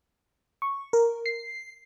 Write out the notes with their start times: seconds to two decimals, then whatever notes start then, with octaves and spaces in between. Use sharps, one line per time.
0.62 C#6
0.93 A#4
1.26 C7